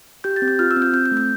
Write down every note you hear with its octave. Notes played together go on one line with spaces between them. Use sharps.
G4 G6
A6
C4
G6
F4 F6
E6
C4
G6
C4 G6
G6
A3
G6